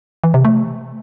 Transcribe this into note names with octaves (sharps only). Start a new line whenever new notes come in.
E3
C3
A3